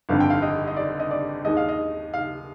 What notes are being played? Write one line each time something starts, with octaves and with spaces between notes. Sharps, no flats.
G1 F2 D3 F5
G5
F5
D#5
D#5
D5
D#5
D5
D#2 D#3 G#3 D#5
F5
D#5
F5